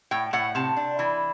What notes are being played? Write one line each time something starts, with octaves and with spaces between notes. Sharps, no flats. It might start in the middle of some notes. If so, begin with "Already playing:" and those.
A2 G5
A2 F#5
C3 A5
D4
E3